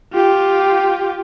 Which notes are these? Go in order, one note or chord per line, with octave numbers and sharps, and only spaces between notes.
F4 G4